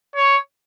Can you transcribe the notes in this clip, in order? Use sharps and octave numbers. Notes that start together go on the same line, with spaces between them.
C#5